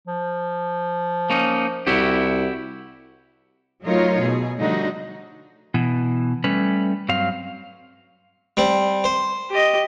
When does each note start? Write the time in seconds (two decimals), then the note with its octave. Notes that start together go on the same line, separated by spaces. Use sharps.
0.08 F3
1.30 A#3 C#4 D#4
1.87 C2 E4 F#4 G4
3.83 F#3 A3 D#4 F4 A#4 C#5
4.19 B2 G#4
4.58 D3 F3 G3 A3 D#4 F#4
5.74 B2 E3
6.44 G3 A3 C#4 B4
7.09 G2 F#3 C4 F5
8.57 G3 C4
9.04 C5
9.50 G4 D#5